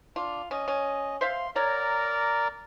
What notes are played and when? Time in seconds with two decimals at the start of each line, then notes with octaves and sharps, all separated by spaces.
0.16 D4 F4
0.51 C#4 D#5
0.68 C#4
1.21 C5 E5 F5 C6
1.56 A#4 C#5 D5 F#5 A#5